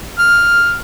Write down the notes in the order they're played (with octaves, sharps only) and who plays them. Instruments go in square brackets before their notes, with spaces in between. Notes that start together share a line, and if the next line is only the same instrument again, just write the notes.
[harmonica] F6